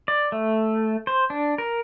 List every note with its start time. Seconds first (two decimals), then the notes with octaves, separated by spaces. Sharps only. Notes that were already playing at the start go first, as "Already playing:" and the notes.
0.08 D5
0.32 A3
1.07 C5
1.30 D4
1.58 A#4